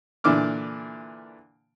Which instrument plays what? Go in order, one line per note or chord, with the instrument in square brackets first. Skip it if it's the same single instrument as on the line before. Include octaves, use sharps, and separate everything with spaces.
[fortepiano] A#2 D3 E3 D4 D6 F6